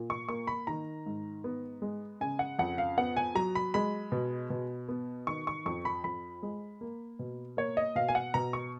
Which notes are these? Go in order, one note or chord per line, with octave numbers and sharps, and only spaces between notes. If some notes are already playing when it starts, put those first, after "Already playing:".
Already playing: A#2
C#6
A#3 C#6
B5
D#3 A#5
G#2
B3
G#3
C#3 G#5
F#5
F2 F#5
F5
B3 F#5
G#5
F#3 A#5
B5
G#3 B5
B2
B2
B3
D#3 C#6
C#6
F2 C#6
B5
F2 B5
G#3
A#3
B2
A#3 C#5
D#5
B2 F5
G#5
F#5
B2 A#5
C#6